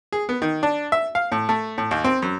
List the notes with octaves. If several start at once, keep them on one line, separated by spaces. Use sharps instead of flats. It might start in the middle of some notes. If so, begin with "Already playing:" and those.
G#4
B3
D#3
D4
E5
F5
A2
A3
A2
D#2
C4
F#2